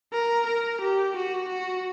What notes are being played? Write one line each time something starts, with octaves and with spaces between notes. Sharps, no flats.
A#4
A#4
G4
F#4
F#4